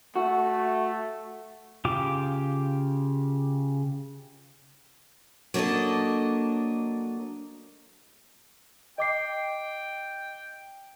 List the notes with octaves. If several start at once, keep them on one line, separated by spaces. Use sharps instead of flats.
A3 F#4
C#3 F4 G4 G5 D6
F#3 A#3 D4 A4 D#5
D#5 G5 D6 C7